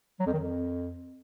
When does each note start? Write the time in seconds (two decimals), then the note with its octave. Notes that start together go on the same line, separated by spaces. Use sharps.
0.20 F#3
0.26 F2
0.33 D#3
0.39 F2